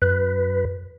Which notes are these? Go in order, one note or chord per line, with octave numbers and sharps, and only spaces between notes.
F#2 B4